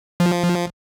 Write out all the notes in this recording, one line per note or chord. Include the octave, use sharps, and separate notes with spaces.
F3